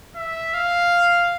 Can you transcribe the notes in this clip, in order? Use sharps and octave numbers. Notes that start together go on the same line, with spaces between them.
E5
F5